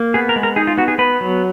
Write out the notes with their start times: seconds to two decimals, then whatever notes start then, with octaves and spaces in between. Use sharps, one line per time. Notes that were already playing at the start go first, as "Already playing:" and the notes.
Already playing: A#3
0.14 B3 G#4
0.29 A#4
0.36 G#3
0.43 A#4
0.56 D#4 G#4
0.67 F4
0.77 B3 F#4
0.88 G#4
0.99 B3 B4
1.21 F#3